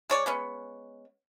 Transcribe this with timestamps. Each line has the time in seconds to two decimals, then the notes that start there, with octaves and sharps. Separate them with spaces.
0.10 G#3 C#5 D5
0.26 G#3 B3 C#4